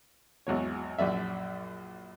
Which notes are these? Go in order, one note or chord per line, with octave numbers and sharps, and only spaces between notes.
G#1 E2 F#3 C#5
A#1 F#2 D5 E5